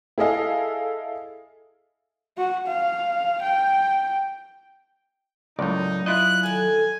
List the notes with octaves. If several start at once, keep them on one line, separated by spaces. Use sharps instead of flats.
E4 G#4 A4 D#5 F5
F#4
F5
G5
C#2 A2 F#3 D#4 A#4 D5
E4 F4 D#5 F#6
D#3 A4 G#5